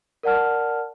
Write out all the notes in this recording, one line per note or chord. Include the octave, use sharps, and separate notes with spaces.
A#4 D5 F#5 A5 F6